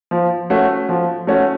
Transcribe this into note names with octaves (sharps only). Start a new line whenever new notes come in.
F3
A3 C#4 F#4
F3
A3 C#4 F#4